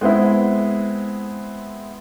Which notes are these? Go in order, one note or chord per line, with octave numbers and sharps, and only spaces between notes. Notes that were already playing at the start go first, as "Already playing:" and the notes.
G#3 B3 C4 E4